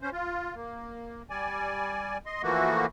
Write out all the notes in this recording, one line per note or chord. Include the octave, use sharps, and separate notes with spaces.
C#4 C5
F4
A#3
G3 D5 G#5
D#5 C6
E3 F3 A3 A#3 F#4